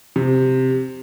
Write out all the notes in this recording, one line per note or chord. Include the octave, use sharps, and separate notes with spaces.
C3